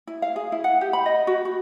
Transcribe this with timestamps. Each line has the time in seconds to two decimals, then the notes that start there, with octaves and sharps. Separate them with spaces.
0.07 E4
0.22 F5
0.36 G#4
0.52 E4
0.64 F#5
0.81 G4
0.93 B5
1.06 D#5
1.27 F#4
1.45 F#4